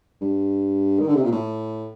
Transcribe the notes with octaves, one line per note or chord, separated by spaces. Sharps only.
G2
D#3
D3
C3
A#2
A2